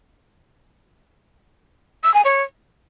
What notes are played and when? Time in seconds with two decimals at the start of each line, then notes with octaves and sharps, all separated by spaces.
2.03 E6
2.14 G#5
2.25 C#5